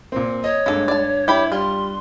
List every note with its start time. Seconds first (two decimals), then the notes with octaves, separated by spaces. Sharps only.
0.12 A#2 C4
0.44 C#5 D#5
0.66 G2 G#3 A#3 A4
0.88 D5 A5
1.28 E4 G4 B5
1.52 G3 F4 C6